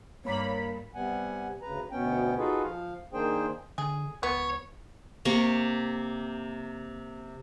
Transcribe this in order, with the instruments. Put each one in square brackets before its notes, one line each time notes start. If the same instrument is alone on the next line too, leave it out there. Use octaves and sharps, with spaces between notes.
[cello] G2 [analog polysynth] A#3 B5 [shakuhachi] C#5
[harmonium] C3 G3 B3 F#5 G#5
D2 C#3 B4 A#5
D2 B2 B3 C#4 G5
D#4 F4 F#4 G#4 A4 B4
F3 F5
D#3 A#3 D4 G#4 C5 G5
[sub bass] D3 [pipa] G#4
[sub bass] C#2 [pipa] B3 [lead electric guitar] C#5
[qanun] C3 A#3 C#6